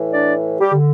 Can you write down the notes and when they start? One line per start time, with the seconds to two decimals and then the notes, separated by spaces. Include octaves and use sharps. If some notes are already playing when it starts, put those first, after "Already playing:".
Already playing: A2 E3
0.12 D4 D5
0.59 G3 G4
0.73 D3